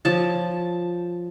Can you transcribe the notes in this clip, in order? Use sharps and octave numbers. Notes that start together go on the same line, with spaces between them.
F3 C#5 A5